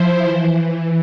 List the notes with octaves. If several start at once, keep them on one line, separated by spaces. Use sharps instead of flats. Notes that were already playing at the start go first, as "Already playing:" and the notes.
Already playing: F3 E4 C5
E3